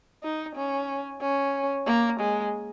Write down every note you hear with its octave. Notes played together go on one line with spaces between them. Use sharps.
D#4
C#4
C#4
A#3
G#3